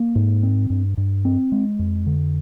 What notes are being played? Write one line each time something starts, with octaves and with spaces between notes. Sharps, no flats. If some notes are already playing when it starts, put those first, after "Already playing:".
Already playing: A#3
G#2
C4
G2
G2
C4
G#3
F2
D3